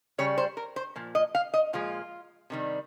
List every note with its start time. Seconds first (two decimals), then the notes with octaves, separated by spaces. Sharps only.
0.18 C#3 G3 C#5
0.38 C5
0.57 A#4
0.76 C5
0.96 A#2 F3
1.15 D#5
1.35 F5
1.54 D#5
1.73 A#2 F3 G#3 F4
2.50 C3 D#3 G3